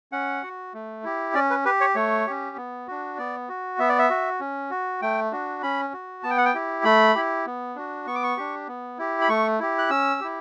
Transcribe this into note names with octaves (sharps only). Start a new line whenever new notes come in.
C#4 F#5
F#4
A3
E4 G4
C#4 D5
B4
G4 B4
C#5
A3 C#5
C#4 G4
B3
D4 F#4
B3 D5
F#4
B3 E5
D5
E5
F#4
C#4
F#4
A3 G5
D4 F#4
C#4 B5
F#4
B3 A5
G5
F#5
G5
E4 G4
A3 B5
E4 G4
B3
D4 F#4
B3 C#6
D6
C#6
D4 G4
B3
E4 G4
B5
A3 C#6
E4 G4
F#6
C#4 E6
E4 G4